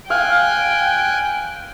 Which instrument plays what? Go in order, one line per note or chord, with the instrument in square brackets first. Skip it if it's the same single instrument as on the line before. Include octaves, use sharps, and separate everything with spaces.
[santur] F5 [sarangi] G5 [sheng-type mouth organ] G#5 F#6